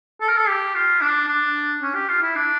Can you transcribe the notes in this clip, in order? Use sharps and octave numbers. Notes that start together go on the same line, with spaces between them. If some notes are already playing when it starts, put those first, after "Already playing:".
A4
A#4
A4
G4
F4
D4
D4
C#4
G4
F4
E4
D4